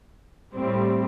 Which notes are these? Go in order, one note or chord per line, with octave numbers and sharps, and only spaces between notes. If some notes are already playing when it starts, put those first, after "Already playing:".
A2 G3 C4